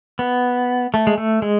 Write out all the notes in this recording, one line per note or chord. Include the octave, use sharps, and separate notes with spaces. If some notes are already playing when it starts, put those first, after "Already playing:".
B3
A3
G#3
A3
G#3